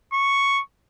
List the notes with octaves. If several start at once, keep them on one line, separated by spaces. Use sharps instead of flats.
C#6